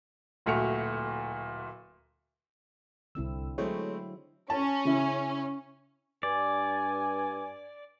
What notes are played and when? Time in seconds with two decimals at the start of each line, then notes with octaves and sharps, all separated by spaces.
0.46 D1 A#2 A3 F#4 C#7 F7
3.15 C2 D3 C4 E4 E6
3.58 F#3 G#3 A3 C4 E4 C#5
4.50 C#4 A5
4.85 C#3 E4
6.23 G2 D5 G#5